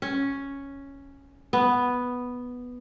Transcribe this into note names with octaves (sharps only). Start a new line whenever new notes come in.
C#4
B3